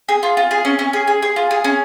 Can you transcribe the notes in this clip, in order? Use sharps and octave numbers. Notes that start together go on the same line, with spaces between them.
G#4
F4
F4
G#4
C#4
C#4
G#4
G#4
G#4
F4
G#4
C#4